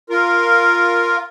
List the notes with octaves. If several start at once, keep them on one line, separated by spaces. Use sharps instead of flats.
F4 A#4